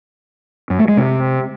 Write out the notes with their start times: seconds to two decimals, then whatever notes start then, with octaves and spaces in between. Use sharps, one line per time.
0.70 F#2
0.79 A3
0.88 G#3
0.97 C3